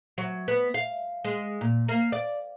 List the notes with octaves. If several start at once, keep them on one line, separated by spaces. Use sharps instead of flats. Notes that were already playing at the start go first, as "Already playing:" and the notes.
F#3
B3
F5
G#3
A#2
A#3
D5